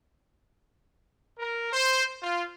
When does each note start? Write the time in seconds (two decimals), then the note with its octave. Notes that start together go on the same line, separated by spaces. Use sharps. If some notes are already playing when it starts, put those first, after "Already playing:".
1.39 A#4
1.73 C5
2.23 F4